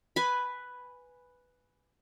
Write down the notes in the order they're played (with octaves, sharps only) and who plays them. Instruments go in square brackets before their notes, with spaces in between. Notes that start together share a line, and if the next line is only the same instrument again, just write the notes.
[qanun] B4 G#5 B5